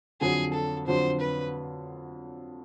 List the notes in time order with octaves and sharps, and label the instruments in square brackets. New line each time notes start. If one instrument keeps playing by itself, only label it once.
[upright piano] F2 D3 F#3 [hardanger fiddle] G#4
[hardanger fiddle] A4
[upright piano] F2 D3 F#3 [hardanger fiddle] C5
[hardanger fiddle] B4